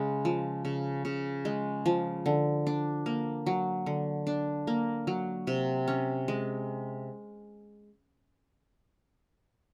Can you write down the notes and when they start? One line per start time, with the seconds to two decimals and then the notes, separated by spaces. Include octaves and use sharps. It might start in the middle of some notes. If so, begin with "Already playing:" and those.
Already playing: C#3 G#3
0.25 F3
0.65 C#3
1.05 C#3
1.45 G#3
1.86 F3
2.26 D3
2.67 D4
3.06 A#3
3.46 F#3
3.86 D3
4.27 D4
4.67 A#3
5.07 F#3
5.47 C3
5.88 C#4
6.28 G#3